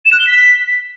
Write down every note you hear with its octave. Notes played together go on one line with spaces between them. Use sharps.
E7
F#6
G7
B6